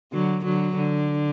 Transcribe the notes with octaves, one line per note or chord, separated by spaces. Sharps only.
D3 F#3
D3 F#3
D3